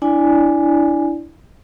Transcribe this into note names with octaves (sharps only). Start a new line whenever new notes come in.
D4 E4 D5 G#5